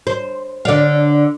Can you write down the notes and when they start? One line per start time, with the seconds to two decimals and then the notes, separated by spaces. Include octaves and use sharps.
0.07 C5
0.65 D3 D5 F5